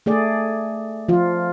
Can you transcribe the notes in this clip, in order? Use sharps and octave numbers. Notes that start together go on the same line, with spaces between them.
A3 G#4 D5
F3 F4